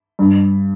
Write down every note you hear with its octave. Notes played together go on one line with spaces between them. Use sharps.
G2